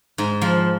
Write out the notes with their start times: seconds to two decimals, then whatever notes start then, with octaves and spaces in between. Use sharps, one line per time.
0.18 G#2
0.42 F3